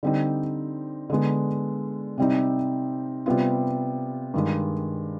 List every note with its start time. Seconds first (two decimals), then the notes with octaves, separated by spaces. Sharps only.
0.03 D3 G3 C4 D#4
1.10 D3 G#3 B3
2.18 C3 G3 C4 D#4
3.26 C3 G3 B3 F4
4.34 G2 D#3 G#3